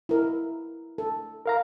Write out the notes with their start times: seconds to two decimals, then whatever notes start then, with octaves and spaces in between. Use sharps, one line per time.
0.09 E4 A#4
0.98 A4
1.46 A#4 F5 A#5